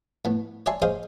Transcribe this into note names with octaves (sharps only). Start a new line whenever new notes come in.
A2 B3
C#5 D5 E5 G#5 A5 C6
G#4 C5 C#5 D#5 F5